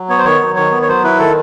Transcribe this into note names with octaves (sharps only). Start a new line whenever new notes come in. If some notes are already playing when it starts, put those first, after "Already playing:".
Already playing: F#3
B3 C#5
C5
D#3 C#5
F#3
D#3 C#5
B3
C#5
F#3 C5
E4 B4
D#3 A4